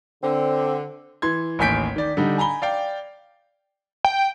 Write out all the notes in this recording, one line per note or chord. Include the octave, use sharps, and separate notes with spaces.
D3 C4
E3 C6 G#6
A1 D#2 G#5 G6 B6 D7
D#3 D5
D3 G3 D#4
G#5 A#5 B5 G7
D5 F5 G5
G5